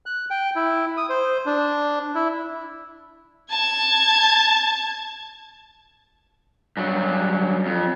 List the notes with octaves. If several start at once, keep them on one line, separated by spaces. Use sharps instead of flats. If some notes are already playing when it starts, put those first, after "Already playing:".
F#6
G5
E4
D#6
C5
D4
E4
A5 G#6
G2 F#3
F2